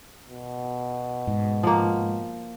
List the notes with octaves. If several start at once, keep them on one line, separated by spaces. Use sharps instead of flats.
B2
G#2
F3 A#3